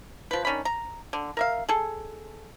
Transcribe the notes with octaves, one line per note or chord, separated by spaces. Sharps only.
F3 B4
D#3 C#4 D4 B5
A#5
D3
A#4 E5 F5
G#4 A4